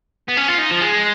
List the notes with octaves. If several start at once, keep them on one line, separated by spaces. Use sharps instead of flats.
B3
C#4
F4
D#4
F3
G#3